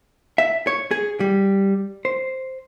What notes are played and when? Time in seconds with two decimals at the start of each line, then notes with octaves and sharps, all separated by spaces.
0.38 E5
0.67 C#5
0.91 G#4
1.20 G3
2.05 C5